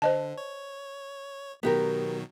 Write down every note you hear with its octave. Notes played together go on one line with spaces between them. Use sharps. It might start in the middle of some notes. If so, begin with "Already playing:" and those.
D3 C5 D#5 A5
C#5
B2 D#3 F#3 B3 G4 A#4